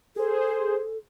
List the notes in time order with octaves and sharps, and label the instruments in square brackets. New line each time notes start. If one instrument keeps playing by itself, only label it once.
[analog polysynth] G#4 C5 [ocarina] A4